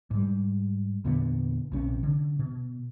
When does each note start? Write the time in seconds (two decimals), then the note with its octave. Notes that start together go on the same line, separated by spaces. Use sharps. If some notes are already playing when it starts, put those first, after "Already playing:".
0.11 G#2 G3
1.05 E2 A#2 D3 B3
1.72 A#1 C3 C#4
2.03 D3
2.39 B2